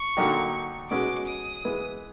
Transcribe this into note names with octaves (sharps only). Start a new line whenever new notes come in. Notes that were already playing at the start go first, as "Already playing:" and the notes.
Already playing: C#6
D3 F#3 A#3 D#4 G4
B2 G#3 C#4 F#4 D6
D#6
E3 G#3 B3